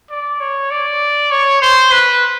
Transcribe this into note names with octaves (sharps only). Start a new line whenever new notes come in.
D5
C#5
D5
C#5
C5
B4